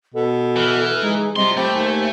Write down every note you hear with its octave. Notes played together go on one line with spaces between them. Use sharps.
B2 A4
E3 F6
G#3 D#4 G#4
C3 G3 F4 D#5 C6
A3 G4 C5 B5
D#2 G#5